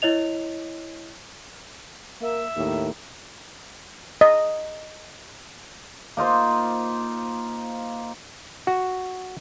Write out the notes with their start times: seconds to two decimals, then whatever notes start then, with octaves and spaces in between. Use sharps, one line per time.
0.02 E4 C#5 D#5 F7
2.22 A#3 E5
2.57 D#2 A2 A#4
4.21 D#5
6.17 A#3 D#4 F4 C5
8.67 F#4